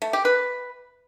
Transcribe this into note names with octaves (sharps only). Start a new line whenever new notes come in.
A3
G4
B4